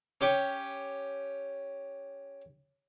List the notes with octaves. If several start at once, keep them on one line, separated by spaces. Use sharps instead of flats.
C#4 G4 C#6